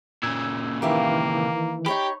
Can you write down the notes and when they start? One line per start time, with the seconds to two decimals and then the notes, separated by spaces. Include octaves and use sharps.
0.23 A#2 C#3 E6 G#6
0.82 D#3 E3 A#3 E4 G4 E5 F5
1.86 D#4 G4 C#5 B5